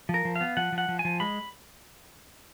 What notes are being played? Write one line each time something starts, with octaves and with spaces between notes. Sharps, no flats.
F3
A#4
F3
B3 F5
F3 F#5
F3
F#5
F3
G#5
F3
G#3 B5